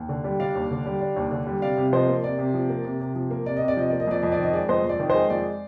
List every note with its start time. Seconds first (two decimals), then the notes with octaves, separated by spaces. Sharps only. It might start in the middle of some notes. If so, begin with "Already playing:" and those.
Already playing: D#2
0.09 D3
0.24 G3
0.40 D4 D5 F5
0.55 D#2
0.71 D3
0.86 G3
1.01 D4
1.16 D#2
1.31 D3
1.47 G3
1.62 C3 D5 F5
1.78 C3
1.93 F3 C5 D#5
2.08 A#3
2.23 C3 D5
2.39 C3
2.54 F3
2.69 A#3
2.85 C3
3.00 C3
3.15 F3
3.30 A#3
3.46 C3 D5
3.57 D#5
3.62 C3
3.68 D5
3.77 F3 D#5
3.89 A#3 D5
4.00 D#5
4.07 F2 D5
4.22 F2 D#5
4.32 D5
4.38 D#3
4.43 D#5
4.53 G#3 D5
4.69 F2 C5 D#5
4.84 F2
4.89 D5
5.00 D#3
5.10 G#3 C5 D#5
5.30 F2 D5